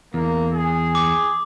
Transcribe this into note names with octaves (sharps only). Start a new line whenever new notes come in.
E2 A#3
G#4
D6